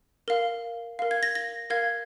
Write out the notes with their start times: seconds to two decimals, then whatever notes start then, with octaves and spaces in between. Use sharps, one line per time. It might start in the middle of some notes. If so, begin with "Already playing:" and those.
0.28 A#4 F5
0.99 A#4 F5
1.11 G#6
1.23 A#6
1.35 A#6
1.70 A#4 F5 G#6